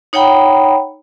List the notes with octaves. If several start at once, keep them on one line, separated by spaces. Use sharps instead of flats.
D#4 C#5 F#5 G5 A#5 B5